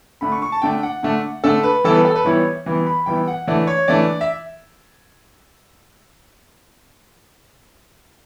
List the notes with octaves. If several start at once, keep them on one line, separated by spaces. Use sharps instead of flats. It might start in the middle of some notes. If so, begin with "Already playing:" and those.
D3 A3 D4 B5
C#6
C#6
A5
D3 A3 D4 G5
F#5
D3 A3 D4
D3 A3 D4 A4
B4
E3 G3 B3 E4 A4
B4
A4
B4
E3 G3 B3 E4 C#5
E3 G3 B3 E4
B5
E3 G3 B3 E4 G5
F#5
E3 A3 D4 D5
C#5
E3 A3 D4 D5
E5